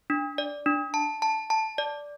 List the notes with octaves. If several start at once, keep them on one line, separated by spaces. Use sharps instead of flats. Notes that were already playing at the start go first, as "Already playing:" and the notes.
D4
D5
D4
A5
A5
A5
D5